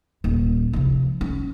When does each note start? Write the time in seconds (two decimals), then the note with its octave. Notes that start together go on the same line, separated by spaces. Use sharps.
0.24 D#1
0.73 C3 F3
1.21 C#4